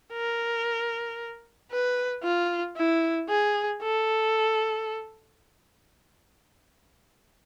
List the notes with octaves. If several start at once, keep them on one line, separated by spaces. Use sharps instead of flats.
A#4
B4
F4
E4
G#4
A4